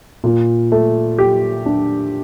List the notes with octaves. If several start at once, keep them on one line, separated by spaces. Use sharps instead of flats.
A#2
A3
G4
D4